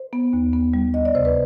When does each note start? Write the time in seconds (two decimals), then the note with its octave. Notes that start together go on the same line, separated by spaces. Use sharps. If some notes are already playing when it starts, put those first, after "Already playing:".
Already playing: C5
0.13 B3
0.33 D#2
0.53 B3
0.74 G3
0.94 D2 D#5
1.05 D5
1.15 C3 C5
1.25 B4